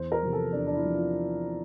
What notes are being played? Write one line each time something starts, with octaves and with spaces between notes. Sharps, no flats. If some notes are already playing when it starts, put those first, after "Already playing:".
Already playing: E2 C5
A#4
C3 F3
A4
E2 D4
D4
E4
C3 F3
F4